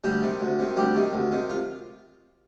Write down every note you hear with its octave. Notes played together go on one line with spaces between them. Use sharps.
D2 G3 G4
C3 D#3
D2
C3 D#3
D2 G3 G4
C3 D#3
D2
C3 D#3
F4